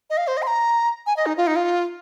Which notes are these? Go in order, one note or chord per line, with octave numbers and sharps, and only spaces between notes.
D#5
F5
C5
D#5
C6
A#5
G#5
D#5
D#4
F4
D#4
F4